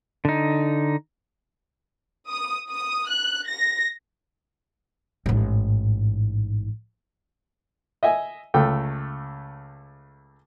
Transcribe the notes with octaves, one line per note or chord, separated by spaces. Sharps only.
D3 D#4
D#6
D#6
F#6
A#6
A1 G#2
D#5 E5 G#5
C#2 A3 G5